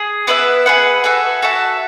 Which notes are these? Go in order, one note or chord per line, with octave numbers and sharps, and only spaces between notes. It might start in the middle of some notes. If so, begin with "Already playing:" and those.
Already playing: G#4
B3 E4 B4 E5
G#4 B4 F#5
F#4 A4 E5 G#5
F#4 A4 E5 A5